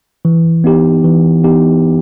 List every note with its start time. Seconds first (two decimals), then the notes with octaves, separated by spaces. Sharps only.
0.25 E3
0.64 B3 D#4 G4
1.04 E3
1.44 B3 D#4 G4